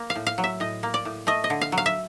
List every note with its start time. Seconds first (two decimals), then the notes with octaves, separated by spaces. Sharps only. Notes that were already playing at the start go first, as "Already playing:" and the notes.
Already playing: A#3
0.10 F5
0.15 A2
0.27 F5
0.38 F#3
0.44 E5
0.60 A2 D#5
0.83 A#3
0.94 D5
1.05 A2
1.27 A3 D#5
1.44 D#5
1.50 D3
1.61 F5
1.72 F#3
1.78 F5
1.86 E5